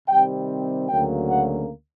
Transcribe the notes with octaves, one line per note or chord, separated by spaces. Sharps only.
C3 D#3 G3 C4 G5
D2 C#3 F#3 A#3 G5
F#5